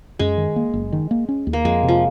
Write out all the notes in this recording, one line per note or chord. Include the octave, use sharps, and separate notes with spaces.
F#2 G#3
D#3
A#3
F#1
D#3
A#3
C#4
D#2
A#3
F2 G#3
C3
F3